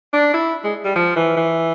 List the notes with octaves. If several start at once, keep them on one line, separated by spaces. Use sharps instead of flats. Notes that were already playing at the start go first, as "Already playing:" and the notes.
D4
E4
G#3
G3
F3
E3
E3